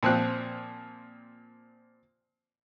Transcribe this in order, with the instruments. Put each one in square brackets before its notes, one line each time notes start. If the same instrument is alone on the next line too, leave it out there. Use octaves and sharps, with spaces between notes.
[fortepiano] A#2 F3 C4 F#6